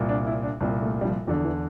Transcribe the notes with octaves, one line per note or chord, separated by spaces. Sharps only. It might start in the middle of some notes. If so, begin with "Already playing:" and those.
Already playing: C2 A#2
D4
E4
D4
C2 A#2 C4
A3
G3
F3
E2 D3 F3
E3